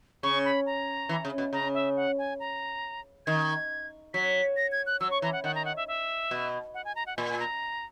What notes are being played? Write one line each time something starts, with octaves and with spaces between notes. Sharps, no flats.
C#3 C#6
B5
A#5
E3
C#3
B2
C#3 A#5
E5
F#5
G#5
A#5
D#3 G#6
F#3 B6
A#6
G#6
F#6
F#3 E6
C#6
E3 A#5
F#5
D#3 F#5
A#5
F#5
E5
E5
B2
F#5
G#5
A#5
F#5
A#2 G#5
G#5
A#5